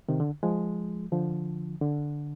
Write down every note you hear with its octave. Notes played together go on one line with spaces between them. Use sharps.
C3 D#3
D3
F3 G#3
D3 F3
D3